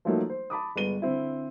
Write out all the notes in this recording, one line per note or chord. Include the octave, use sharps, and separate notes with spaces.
F3 F#3 A3 A#3 D#4
C5
A5 B5 D6 D#6
G1 G#3 B3 D#7 G7
D3 C4 E4